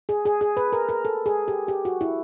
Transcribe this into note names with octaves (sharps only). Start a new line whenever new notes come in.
G#4
G#4
G#4
B4
A#4
A#4
A4
G#4
G4
G4
F#4
E4